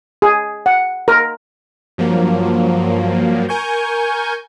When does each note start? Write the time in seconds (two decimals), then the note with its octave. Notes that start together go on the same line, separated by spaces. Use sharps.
0.22 G#4
0.66 F#5
1.08 A#4
1.98 G2 F3 F#3 A#3
3.49 A#4 G#5 C#6 G6